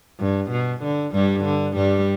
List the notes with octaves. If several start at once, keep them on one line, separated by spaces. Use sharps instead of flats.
G2
B2
D3
G2 G3
D3
G2 G3